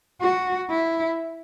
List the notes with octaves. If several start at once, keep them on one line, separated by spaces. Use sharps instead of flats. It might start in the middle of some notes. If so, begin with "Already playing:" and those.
F#4
E4